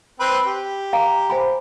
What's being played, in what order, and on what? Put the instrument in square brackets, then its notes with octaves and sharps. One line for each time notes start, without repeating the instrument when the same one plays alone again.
[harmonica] C4 B4
G4
[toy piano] F5 A#5
C5 G#5 B5